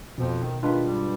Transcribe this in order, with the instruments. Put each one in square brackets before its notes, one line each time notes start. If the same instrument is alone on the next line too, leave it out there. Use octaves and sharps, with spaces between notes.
[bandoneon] F2 F3 [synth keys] B2
[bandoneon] D#3
[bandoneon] D#3 [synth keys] G#3 D4 F4 B4
[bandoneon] G2 G3